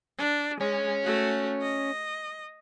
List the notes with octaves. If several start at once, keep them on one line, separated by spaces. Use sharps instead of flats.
D4
G#3 C#4
A3 F#4
D#5